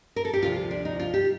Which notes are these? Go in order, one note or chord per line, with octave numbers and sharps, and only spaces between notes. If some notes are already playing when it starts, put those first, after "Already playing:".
A#4
A4
G4
D2 C3 F3 F4
D4
D#4
F4
G4